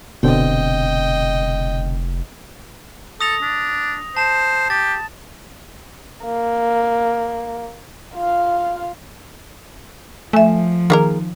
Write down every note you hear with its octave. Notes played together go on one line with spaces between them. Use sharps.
F1 B2 D3 C4 D#5 G5
A4 D#6 A#6 F7
D4
C5 A5 E7
G4 A6
A#3
F4 F5
F3 A3 E5 G#5
D#3 A#3 G#4 A#4